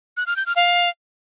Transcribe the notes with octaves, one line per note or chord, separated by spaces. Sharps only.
F#6
F6
G6
F6
F5